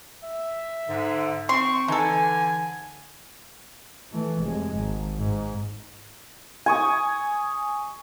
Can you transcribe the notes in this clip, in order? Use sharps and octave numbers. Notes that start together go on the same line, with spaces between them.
E5
G#2 D3
C4 C6 C#6
D3 E3 D#4 A4 G#5
E3 A3
F1 G#3
G#1
G#2
G#5 C#6 D#6